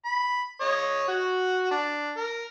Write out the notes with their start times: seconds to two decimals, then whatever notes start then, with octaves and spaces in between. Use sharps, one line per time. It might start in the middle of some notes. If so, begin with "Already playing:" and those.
0.05 B5
0.61 C#5 D#5
1.08 F#4
1.71 D4
2.16 A#4